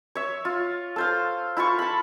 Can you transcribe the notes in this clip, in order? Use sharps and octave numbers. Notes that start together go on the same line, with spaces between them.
C#5 E5
F4
A4 C5 F5
E4 F4 A5 C#6
A5 B5